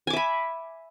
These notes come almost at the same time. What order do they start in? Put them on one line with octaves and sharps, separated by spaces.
G#5 D6 E5 B5